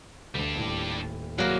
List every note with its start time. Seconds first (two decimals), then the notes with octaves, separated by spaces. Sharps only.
0.35 D2 G3 D4
0.55 D#1 A2
1.38 C2 F#3 A#3